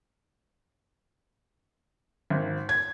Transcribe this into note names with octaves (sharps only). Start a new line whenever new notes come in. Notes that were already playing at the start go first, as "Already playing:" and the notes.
G#1
G#6